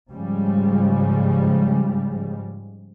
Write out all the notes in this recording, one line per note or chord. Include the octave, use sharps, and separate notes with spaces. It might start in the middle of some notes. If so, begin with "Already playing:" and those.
G#2 C#3 F3 G3 G#3